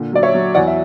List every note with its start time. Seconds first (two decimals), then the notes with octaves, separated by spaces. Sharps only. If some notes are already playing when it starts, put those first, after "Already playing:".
Already playing: A#2 D3
0.13 F#3 D5
0.23 C#5 E5
0.34 F#3
0.54 E2 D5 F#5
0.67 E5